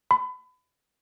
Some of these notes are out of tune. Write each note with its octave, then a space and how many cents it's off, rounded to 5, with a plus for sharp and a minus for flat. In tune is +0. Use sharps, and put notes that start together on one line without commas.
B5 +30